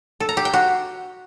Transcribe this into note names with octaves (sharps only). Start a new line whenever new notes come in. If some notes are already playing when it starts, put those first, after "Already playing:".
A4
A#5
G4
G5
F#4